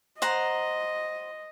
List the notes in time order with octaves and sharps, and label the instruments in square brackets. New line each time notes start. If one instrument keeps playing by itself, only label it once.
[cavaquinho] C5 F#5 A#5 [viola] D#5